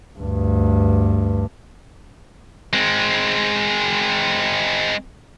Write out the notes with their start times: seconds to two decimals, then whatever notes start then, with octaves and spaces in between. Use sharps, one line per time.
0.19 D2 G2
2.73 G#3 C4